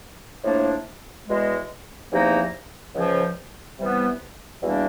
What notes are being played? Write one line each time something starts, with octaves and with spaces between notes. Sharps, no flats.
A2 F3 A#3 D4
E2 B2 G#3
E2 C3 F3 A#3 D#4
C#2 C#3 F3
C3 E3 G3 B3
E2 B2 G3 A#3 D4